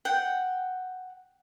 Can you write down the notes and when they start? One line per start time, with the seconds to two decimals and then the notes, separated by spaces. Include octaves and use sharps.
0.05 F#5 G5